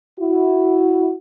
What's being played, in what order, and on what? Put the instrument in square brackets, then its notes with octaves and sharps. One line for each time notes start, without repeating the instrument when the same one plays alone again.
[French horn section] E4 F#4